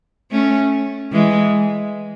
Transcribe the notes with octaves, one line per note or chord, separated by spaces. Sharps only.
A3 C#4
E3 G#3